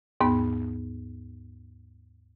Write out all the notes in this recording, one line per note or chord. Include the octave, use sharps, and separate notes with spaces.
D#2 G#2 B3